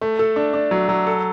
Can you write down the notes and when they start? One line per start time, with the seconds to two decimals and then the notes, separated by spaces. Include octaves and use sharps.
0.02 A3
0.19 A4
0.36 D4
0.54 D4
0.71 F#3
0.89 F#3
1.07 A4